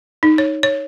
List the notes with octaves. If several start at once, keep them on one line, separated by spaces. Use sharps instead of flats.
D#4
C#5
C#5